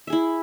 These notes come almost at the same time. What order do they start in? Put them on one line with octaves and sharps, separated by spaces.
E5 G#4 E4